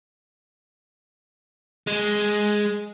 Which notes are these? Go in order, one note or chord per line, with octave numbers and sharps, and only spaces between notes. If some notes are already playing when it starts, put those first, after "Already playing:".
G#3